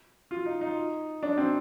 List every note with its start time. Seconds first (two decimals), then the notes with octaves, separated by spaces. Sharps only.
0.31 F4
0.46 D#4
0.61 D#4
1.23 D4
1.38 C4